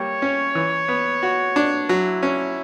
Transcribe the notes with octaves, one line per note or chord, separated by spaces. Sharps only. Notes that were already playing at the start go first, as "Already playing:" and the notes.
Already playing: G3 A#3 C#5
C#4
E3
B3
F#4
D4
F#3 E4
C#4